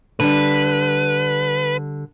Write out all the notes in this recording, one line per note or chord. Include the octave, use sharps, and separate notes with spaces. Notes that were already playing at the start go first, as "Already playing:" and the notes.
D3 G3 B4